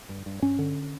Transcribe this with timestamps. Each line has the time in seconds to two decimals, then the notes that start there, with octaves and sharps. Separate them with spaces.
0.09 G2
0.26 G2
0.42 G2 C#4
0.59 D3